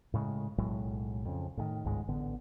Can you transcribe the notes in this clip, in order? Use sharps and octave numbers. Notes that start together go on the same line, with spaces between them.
A2 C#3 G#3
B1 A2 F#3 G#3
F2 C#3
A2 C3 D#3
G1 C#2 G#2 G#3
A1 D3 B3